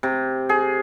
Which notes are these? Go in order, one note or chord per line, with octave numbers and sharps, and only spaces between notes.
C3
G#4